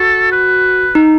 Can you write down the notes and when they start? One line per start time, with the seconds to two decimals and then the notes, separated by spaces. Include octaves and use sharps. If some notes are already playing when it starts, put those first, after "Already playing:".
Already playing: F#4 A4
0.32 B4
0.95 D#4